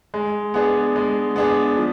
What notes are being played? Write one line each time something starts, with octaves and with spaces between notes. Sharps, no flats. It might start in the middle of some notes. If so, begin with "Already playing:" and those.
G#3
B3 D4 G#4
G#3
B3 D4 G#4
F3